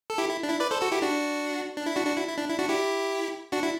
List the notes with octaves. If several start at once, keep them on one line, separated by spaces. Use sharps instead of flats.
A4
E4 G4
E4
D4
E4
B4 D5
A4 C5
F#4 A4
E4 G4
D4 F#4
D4
E4
D4 F#4
D4 F#4
E4
E4
D4
E4
D4 F#4
E4 G4
D4 F#4
E4